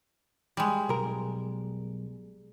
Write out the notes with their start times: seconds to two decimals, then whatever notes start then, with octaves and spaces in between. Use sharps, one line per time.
0.57 G3 G#3
0.89 B1 A#4